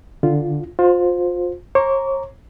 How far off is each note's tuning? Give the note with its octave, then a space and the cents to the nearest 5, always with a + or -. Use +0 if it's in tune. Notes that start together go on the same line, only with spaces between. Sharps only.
D3 +0 F4 -5
F4 +30 C5 +0
C#5 -45 A#5 +0 D6 -40